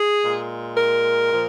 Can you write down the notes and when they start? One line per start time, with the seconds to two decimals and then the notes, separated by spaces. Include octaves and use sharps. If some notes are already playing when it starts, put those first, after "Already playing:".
Already playing: G#4
0.22 A#2 G#3
0.76 A#4
1.31 A#2 F3